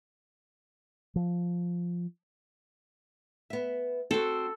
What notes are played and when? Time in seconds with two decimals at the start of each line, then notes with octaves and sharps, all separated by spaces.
1.16 F3
3.50 B3 E5
4.11 C4 F#4 A4